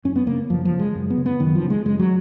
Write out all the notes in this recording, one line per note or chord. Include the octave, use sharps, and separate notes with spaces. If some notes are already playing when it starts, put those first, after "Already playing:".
F#2 C#4
B3
C#3 A#3
F#2 F3
F3
C#3
G#3
F#2
B3
C#3
B3
F#2 D#3
F3
C#3
G#3
F#2 G#3
F#3